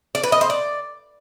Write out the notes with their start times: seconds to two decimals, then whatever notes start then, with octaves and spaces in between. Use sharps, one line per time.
0.15 D5
0.24 B4
0.32 D#5
0.41 C5
0.50 D5